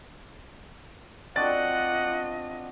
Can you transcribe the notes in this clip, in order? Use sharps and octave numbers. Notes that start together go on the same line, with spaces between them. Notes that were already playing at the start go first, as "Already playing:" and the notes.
C4 D4 F4 F#4 D5 D#5 F#5 A6